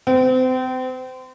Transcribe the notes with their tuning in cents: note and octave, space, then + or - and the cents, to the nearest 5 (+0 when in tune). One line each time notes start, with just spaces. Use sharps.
C4 -30